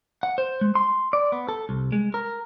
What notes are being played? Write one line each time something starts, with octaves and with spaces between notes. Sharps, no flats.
F#5
C5
G#3
C6
D5
B3
A4
C2
G#3
A#4